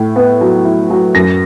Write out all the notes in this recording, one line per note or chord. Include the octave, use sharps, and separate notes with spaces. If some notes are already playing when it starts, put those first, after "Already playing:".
Already playing: A2 E4
B3
F#3
E4
F#3
F#2 A#6